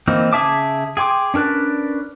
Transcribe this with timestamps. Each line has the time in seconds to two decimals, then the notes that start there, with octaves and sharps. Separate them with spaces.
0.07 E3 A#3 C4 D#4
0.33 C#3 G#4 E5 A5 D6
0.97 G#4 G5 C6 D6
1.34 C#4 D4 A#4 B4 D5